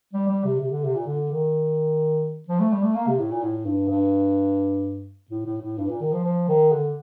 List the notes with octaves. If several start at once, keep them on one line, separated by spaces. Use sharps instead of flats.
G3
G3
C3
C3
D3
C3
A#2
D3
D#3
F3
A3
G3
A3
A#3
C3
A2
A#2
A2
G2
G2
A2
A2
A2
G2
A#2
D#3
F3
F3
D#3
D3